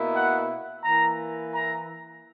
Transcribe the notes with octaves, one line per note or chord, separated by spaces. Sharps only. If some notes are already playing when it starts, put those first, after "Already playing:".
Already playing: B2 A#3 E4
F#5
E3 A#3 E4 A#5
A#5